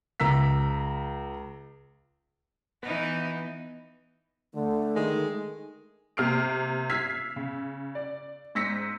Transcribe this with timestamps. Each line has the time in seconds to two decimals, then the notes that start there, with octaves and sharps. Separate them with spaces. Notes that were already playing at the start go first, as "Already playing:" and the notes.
0.20 C#2 A#5 E6 B6
2.83 E3 B3 D#4
4.54 D3 A3
4.96 D#3 G#3
6.17 C3 A#3 F6 C7 D7
6.90 E6 F6 G#6 B6 C7
7.36 C#3
7.95 D5
8.55 G#2 E6 A#6 B6 C#7